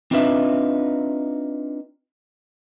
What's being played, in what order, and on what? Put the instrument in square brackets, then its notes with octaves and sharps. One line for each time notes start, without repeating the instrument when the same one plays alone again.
[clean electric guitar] C4 D4 D#4 F4 B4 E5